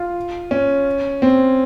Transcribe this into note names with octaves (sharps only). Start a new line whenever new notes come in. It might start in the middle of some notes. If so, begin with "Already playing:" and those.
Already playing: F4
C#4
C4